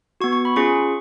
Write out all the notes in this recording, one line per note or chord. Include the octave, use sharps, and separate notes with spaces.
B3 F#4 C#6
C#6
B5
C#4 F4 G#4 C#6